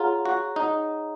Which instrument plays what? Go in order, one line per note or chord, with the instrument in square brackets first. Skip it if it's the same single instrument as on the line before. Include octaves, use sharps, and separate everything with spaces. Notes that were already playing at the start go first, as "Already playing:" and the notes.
Already playing: [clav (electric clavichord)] F4 [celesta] G#4 C#5 F#5 A#5
[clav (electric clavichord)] F#4
D#4